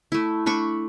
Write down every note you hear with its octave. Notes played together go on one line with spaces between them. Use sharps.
A3 E4
A3 D4 B5 C#6